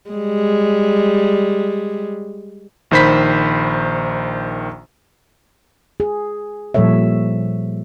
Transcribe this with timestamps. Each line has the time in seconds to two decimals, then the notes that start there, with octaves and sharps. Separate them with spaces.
0.11 G3 G#3
2.91 A#1 D#3 C5 B5 B6
6.00 G#4
6.74 A#2 F3 G3 A4 C#5 E5